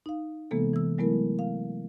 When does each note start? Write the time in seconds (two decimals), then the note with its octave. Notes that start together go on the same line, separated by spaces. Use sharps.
0.06 D#4 F5
0.51 C3 E3 G#3 A#3 B3 A4
0.74 E3 E6
0.98 F#3 G#3 A3 B3 E4 A#4
1.39 F5